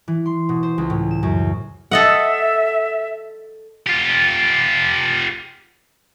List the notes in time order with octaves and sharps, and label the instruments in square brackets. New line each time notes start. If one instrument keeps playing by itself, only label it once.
[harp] E3
C6
B2
C5
C#2
A2
E7
F#2
[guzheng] A4 D#5 F#5 [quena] E5
[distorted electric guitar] F4 G4